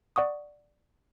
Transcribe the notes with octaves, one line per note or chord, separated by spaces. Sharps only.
D5 F#5 C#6 D#6